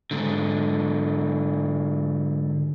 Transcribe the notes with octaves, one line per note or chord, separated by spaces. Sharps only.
G#2 D3